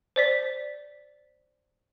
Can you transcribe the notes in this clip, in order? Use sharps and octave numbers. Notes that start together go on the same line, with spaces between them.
C5 D5 B6